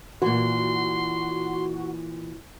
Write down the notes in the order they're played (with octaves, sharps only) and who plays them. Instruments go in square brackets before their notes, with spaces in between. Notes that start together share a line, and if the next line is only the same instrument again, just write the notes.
[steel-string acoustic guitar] A#2 E3 [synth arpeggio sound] F#4 [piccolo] C6